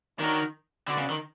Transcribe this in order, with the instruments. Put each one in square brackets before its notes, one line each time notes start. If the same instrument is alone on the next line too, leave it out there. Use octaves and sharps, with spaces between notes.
[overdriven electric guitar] D#3 [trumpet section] D4 F#4 A#4 C#5
[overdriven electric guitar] D3 [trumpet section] F#4 B4 D5
[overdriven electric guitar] C#3
D#3